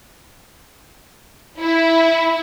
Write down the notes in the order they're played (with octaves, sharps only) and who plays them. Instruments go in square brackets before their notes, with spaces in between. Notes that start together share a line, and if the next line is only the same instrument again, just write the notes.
[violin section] E4